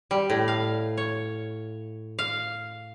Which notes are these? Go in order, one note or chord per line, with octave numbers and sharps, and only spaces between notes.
G3
A2
F5
C#5
F5